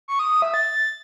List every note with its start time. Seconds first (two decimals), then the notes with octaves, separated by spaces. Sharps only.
0.08 C#6
0.19 D#6
0.31 D#6
0.42 E5
0.54 A6